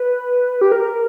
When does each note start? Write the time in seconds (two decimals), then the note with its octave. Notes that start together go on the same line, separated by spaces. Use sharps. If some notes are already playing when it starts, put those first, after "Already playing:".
Already playing: B4
0.61 G4
0.72 A#4